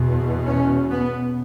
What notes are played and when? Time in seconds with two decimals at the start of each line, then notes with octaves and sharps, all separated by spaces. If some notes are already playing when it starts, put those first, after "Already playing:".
Already playing: E2 B2
0.46 C#4
0.91 B3